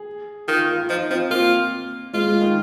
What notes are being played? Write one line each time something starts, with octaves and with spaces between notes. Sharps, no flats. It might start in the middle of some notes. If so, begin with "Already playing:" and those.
Already playing: G#4
D#3 F4
F4
F4
F3 D#4
F3 C4
A#3 F4
G#3 F4
G#3
D#3